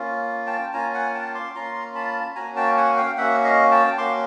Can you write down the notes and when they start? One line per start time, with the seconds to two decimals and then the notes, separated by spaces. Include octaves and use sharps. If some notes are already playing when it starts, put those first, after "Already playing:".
Already playing: A#3 C#4 F4
0.47 G5 A5
0.73 A#3 C#4 F4 G#5 A#5
0.94 F#5 G#5
1.14 G5 A5
1.35 C6 D6
1.55 A#3 C#4 F4 A#5 C6
1.95 A5 B5
2.36 A#3 C#4 F#4 G#5 A#5
2.56 G5 A5
2.77 F#5 G#5
2.97 F5 G5
3.17 A#3 C#4 F#4 E5 F#5
3.45 D#5 F5
3.71 G5 A5
3.98 A#3 C#4 F#4 C6 D6